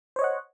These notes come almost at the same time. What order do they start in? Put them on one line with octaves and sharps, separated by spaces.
C5 C#5 D#5 F#5